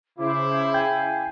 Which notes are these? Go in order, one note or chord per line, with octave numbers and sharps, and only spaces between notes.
C#3 E4 C5 D6
F5 G5 G#5 G6 G#6